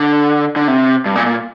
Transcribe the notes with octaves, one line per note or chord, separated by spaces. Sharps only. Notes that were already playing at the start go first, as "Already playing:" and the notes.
Already playing: D3
D3
C3
G2
A#2
A#2